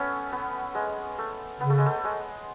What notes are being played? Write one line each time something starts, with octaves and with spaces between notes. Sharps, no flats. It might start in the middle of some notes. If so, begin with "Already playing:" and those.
Already playing: A3 B3 C#4
B3
G#3
A3
C#3 B3
A3
G#3
A3
G#3